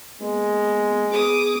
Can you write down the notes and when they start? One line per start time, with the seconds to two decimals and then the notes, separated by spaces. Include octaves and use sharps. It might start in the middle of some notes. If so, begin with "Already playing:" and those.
0.21 G#3 A#3 B3
1.11 B3 G#4 D6 D#6